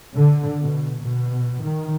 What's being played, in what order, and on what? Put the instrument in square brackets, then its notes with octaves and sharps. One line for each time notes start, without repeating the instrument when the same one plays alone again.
[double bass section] D3
B2
B2
D#3